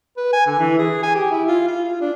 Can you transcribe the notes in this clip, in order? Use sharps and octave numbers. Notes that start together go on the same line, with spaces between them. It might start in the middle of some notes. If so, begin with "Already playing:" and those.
B4
G#5
D3
E3
G#4
G#5
G4
E4
F4
F4
F4
D4